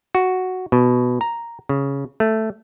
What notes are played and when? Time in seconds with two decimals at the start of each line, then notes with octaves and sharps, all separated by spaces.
0.15 F#4
0.72 B2
1.21 A#5
1.69 C#3
2.20 A3